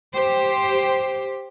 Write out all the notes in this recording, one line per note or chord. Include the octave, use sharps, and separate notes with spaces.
G4 C5